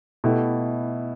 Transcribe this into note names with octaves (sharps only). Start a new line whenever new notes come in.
B2 A3 E4 G4